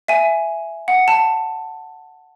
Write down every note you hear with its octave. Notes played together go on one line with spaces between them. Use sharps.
E5 G#5
F#5
A5